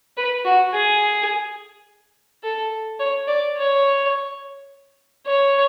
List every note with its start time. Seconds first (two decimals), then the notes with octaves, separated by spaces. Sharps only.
0.17 B4
0.45 F#4
0.73 G#4
2.44 A4
3.00 C#5
3.28 D5
3.56 C#5
5.27 C#5